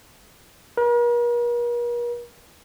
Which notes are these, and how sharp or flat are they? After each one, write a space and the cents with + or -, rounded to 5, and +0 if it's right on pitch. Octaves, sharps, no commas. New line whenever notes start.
A#4 +45